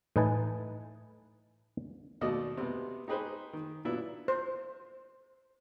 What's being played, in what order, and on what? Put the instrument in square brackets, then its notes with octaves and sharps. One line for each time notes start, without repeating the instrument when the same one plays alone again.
[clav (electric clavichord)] A2 E3 D#4 B4 G#5 A5
[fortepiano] D#2 B2 A3 A4 D5 D#5
C3 B3
D#4 G4 G#4 B4 C5
D#3
A#2 F#3 B3 D4 E4
[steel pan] C5